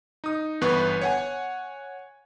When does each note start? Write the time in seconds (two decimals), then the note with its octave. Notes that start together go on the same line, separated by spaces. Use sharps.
0.24 D#4 D#6
0.61 G1 E3 B3 B4 C#6
1.02 C#5 F#5 G#5